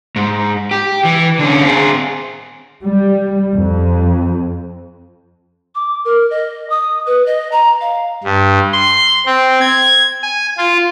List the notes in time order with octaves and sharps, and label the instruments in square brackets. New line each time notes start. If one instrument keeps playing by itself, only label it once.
[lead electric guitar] G#2
G4
E3
D3 C#4
C4 G#4
[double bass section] G3
F2
[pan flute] D6
A#4
D#5
D#6
B4
D#5
A#5
F5
[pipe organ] G2
C6
C4
G#6
G#5
F4